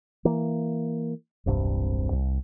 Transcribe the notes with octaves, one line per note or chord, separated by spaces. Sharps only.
E3 A#3
E1 C2 G2 C4
C2